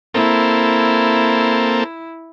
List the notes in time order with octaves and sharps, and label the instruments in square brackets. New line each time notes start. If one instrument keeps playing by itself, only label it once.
[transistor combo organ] A#3 C4 A4 [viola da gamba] E4